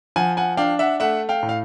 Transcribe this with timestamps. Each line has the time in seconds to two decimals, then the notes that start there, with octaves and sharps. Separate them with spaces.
0.16 F3 F#5 G#5
0.37 F#5 G#5
0.57 D4 F5 G5
0.79 E5 F#5
1.00 A3 E5 F#5
1.29 F5 G5
1.43 A2
1.49 F5